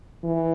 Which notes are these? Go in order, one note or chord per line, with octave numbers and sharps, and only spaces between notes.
E3